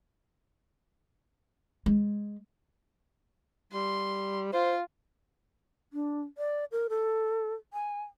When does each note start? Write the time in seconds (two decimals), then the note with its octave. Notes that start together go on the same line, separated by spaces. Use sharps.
1.86 G#3
3.73 G3 C6
4.53 F4 C5
5.93 D4
6.38 D5
6.72 A#4
6.90 A4
7.73 G#5